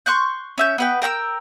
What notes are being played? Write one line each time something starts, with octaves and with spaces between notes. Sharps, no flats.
C6 C#6 F#6 G6
C#4 E5 G6
B3 B4 G5
A#4 G5 C#6 E6